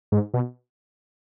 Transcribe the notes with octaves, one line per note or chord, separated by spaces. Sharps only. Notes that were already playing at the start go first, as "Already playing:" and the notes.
G#2
B2